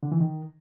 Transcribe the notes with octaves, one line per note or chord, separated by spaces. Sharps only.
D3
E3
D#3